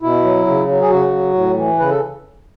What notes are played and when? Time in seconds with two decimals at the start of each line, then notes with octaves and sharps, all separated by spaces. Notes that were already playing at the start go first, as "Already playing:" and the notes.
0.02 B2 E4
0.24 F#3
0.47 C#3
0.68 F#3
0.81 G#4
0.90 C#3 F#4
1.12 F#3
1.34 A2
1.56 E3
1.79 C#3 B4
1.90 A4